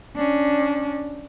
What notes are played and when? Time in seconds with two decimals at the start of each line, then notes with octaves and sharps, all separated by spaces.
0.16 C#4 D4